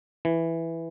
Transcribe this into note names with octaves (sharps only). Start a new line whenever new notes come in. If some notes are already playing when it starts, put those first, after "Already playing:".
E3